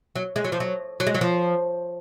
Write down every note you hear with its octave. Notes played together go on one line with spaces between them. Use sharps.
F#3
G#3
F#3
F3
F#3
F#3
G#3
F#3
F3